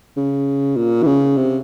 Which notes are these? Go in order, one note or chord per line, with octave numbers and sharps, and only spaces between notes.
C#3
A#2
E3
C#3
C3